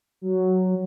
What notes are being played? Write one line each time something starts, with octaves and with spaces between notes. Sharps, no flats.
F#3